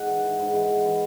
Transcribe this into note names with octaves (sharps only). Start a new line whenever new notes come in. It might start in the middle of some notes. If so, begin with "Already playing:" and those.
Already playing: G#2 F#5
E3
E3
G#2
E3
E3
E3